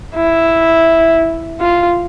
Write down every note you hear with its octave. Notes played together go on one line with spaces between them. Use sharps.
E4
F4